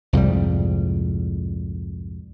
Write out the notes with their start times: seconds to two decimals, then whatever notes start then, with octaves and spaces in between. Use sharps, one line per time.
0.13 C2 F2 G#2 G3